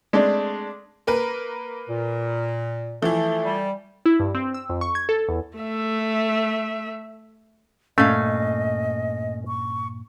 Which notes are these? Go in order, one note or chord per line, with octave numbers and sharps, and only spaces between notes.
G#3 A3 C4 D4
A#3 A#4 B4
A#2
E3 F3 A3
G3
E4
G2
C4
E6
F2
C#6
G#6
A4
E2
A3 E5
G2 A#2 A3 C#4 D#5 F5
C#6